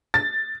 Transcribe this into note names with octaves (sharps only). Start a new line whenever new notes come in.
A6